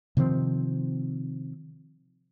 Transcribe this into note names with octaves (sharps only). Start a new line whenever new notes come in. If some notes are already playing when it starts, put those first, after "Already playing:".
C3 D#3 F3 C4